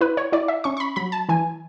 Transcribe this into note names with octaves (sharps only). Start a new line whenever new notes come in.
E4 B4
C#5
E4 D5
E5
C#4 C#6
C#6
B5
F#3 B5
A5
E3 G#5